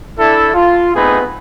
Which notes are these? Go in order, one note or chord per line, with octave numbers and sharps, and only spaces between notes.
D4 E4 A4
F4
A3 B3 C4 D#4 G#4 B4